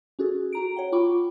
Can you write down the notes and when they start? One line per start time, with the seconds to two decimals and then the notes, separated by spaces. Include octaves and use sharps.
0.19 C#4 F#4 G#4 A4
0.53 F#4 A#5 D7
0.76 C#5 F#5 G5
0.92 F4 G5 B5 C#6 D6